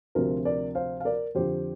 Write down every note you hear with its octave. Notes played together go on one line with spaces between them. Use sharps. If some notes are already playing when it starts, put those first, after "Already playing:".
D2 C3 F3 F4 A#4
A#4 D5
C5 F5
F5
A#4 D5
F2 D3 F3 G4 C5